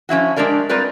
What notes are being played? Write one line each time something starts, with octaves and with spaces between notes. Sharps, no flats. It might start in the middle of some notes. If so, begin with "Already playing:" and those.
F3 C#4 E4 F#4
G#3 D4 G4 A#4 D5
G3 C4 F4 A#4 B4 D5